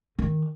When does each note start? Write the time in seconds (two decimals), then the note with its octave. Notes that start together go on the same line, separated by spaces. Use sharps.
0.19 D#3